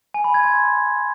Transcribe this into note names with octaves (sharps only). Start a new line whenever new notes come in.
G#5
B5
G#6
C6